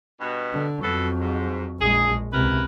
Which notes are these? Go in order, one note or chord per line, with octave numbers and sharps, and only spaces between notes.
G2 B2
D3
F2 B2 F#3 A4
G#2
A#1 G#3 G#4
C#2 C3 E4 A#4 B4